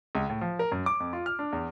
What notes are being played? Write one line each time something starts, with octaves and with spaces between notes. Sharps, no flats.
C#2
A2
F3
A#4
F#2
D6
F2
F4
F6
D4
E2